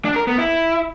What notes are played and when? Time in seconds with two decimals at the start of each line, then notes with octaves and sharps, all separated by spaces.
0.05 D4
0.16 A#4
0.27 B3
0.38 E4